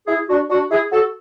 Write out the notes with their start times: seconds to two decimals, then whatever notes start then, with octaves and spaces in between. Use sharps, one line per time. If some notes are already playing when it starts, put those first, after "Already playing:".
0.07 E4 G#4
0.29 D4 F#4
0.50 D4 F#4
0.71 E4 G#4
0.92 F#4 A4